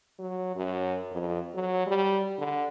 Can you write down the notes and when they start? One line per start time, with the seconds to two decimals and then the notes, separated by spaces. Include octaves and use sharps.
0.19 F#3
0.56 F#2
1.11 F2
1.55 F#3
1.87 G3
2.38 D3